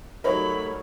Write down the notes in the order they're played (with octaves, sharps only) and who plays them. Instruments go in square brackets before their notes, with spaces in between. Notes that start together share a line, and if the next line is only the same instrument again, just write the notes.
[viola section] F#3 G3 A3 [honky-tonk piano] D#4 C#5 [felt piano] A#4 [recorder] B5